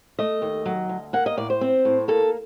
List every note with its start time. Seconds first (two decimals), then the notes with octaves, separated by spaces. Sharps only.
0.19 A3 D#5
0.42 D#2
0.66 F#3
0.89 D2
1.13 A#3 F#5
1.26 D#5
1.37 A2 D5
1.50 C5
1.61 C4
1.85 A2
2.08 A#3 A4